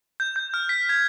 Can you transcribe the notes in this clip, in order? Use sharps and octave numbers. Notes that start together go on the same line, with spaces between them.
G6
G6
F6
B6
G#6